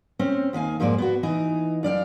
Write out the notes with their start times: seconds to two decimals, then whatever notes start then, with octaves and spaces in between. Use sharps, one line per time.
0.19 C4 C#4 C5
0.53 D#2 D#3 F5 G#5
0.80 F2 G#2 F3 A#3 C5 D5
0.98 B3 F#4
1.23 E3 D#4
1.83 F#2 D5 F5 G5